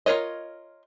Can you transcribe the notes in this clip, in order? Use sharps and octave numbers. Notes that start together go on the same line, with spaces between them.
F4 G#4 A#4 C#5 D#5